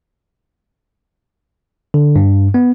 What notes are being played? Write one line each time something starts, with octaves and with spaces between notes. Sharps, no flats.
D3
G2
B3